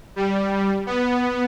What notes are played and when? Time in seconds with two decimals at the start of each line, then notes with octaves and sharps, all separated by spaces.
0.16 G3
0.86 B3